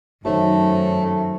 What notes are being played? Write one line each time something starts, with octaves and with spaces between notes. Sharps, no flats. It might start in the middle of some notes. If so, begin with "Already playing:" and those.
F#2 D#3 A3 D#4 F#4 C5 C#5 A5